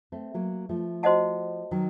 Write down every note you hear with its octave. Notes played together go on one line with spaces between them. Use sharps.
A3 C4
F#3 A#3
F3 A3
F#4 C5 D#5 F#5 A5
D#3 F#3